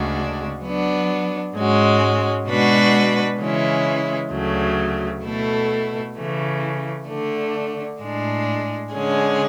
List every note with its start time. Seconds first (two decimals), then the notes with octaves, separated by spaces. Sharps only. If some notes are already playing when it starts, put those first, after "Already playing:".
Already playing: D2 C#3 G#3 D4 F#4
0.63 F#3 B3 D4
1.55 G#2 G#3 C#4 F#4
2.47 B2 G#3 D4 F#4 B4
3.40 C#3 E3 G#3 C#4 E4
4.32 D2 C#3 F#3 A3
5.24 B2 A3 E4 A4
6.16 C#3 E3 A3
7.08 D3 A3 D4
8.01 A2 G#3 D4
8.92 D3 G#3 C#4 G#4